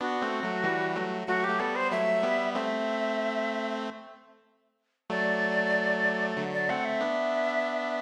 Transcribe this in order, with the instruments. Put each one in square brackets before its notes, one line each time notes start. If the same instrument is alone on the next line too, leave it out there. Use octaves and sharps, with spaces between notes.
[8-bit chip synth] B3 D4 [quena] F#4
[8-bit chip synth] A3 C4
F#3 A3
E3 G3
F#3 A3
[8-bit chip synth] F#3 A3 [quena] F#4
[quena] G4
[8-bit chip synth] A3
[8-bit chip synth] G3 B3 [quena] A4
[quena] C5
[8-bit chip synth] F#3 A3 [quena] E5
[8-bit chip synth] G3 B3
[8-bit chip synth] A3 C4 [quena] E5
[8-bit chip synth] F#3 A3 [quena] D5
[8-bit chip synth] D3 F#3
[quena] D5
[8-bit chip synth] A3 C4 [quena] F#5
[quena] E5
[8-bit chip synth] B3 D4